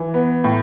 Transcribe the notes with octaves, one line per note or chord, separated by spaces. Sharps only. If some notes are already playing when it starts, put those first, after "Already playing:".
Already playing: E3
B3
A2